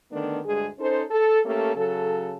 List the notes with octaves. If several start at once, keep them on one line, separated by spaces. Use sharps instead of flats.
D3 D#3 A3 B3 D4
D2 G2 G#3 G#4
C#4 D#4 A4 C5
A4
A3 A#3 C#4 G4 A4
C#3 F#3 A4